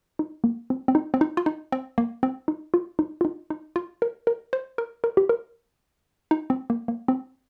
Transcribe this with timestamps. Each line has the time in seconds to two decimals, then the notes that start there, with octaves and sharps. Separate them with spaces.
0.19 D#4
0.44 A#3
0.70 C4
0.88 C4
0.95 D#4
1.14 C4
1.21 D#4
1.37 F4
1.46 D#4
1.72 C4
1.98 A#3
2.23 C4
2.48 D#4
2.74 F4
2.99 D#4
3.21 F4
3.25 D#4
3.50 D#4
3.76 F4
4.02 A#4
4.27 A#4
4.53 C5
4.78 A#4
5.04 A#4
5.17 G4
5.29 A#4
6.31 D#4
6.50 C4
6.70 A#3
6.88 A#3
7.08 C4